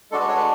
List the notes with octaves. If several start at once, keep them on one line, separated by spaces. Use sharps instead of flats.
G#3 D4 F#4 A4
B4
C#5
B4